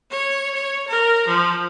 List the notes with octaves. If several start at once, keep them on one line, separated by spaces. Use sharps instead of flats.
C#5
C#5
A#4
F3